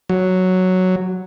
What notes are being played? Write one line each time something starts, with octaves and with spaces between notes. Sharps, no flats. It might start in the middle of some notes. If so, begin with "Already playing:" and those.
F#3